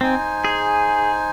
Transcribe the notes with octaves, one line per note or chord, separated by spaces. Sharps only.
C4 D#4 C5 G#5
G#4